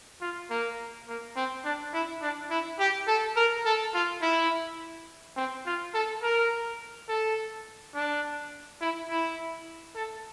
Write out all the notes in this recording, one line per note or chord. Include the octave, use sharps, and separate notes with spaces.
F4
A#3
A#3
C4
D4
E4
D4
E4
G4
A4
A#4
A4
F4
E4
C4
F4
A4
A#4
A4
D4
E4
E4
A4